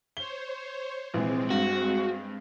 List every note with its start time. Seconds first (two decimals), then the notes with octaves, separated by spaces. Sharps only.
0.17 C5 C#5 G7
1.14 A#1 C3 E3 G#3 C4
1.50 G2 F#4